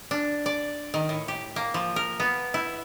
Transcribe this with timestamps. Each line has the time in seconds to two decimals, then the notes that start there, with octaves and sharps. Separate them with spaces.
0.11 D4
0.46 D5
0.94 D#3
1.09 A2
1.28 G4
1.56 A#3
1.74 F3
1.96 A#4
2.20 B3
2.54 E4